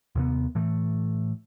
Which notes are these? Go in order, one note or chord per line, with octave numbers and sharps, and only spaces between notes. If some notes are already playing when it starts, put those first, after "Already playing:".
D#2 C3 B3
A2 E3 A3